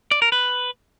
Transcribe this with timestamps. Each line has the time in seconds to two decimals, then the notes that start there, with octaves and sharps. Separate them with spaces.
0.11 D5
0.22 A#4
0.32 B4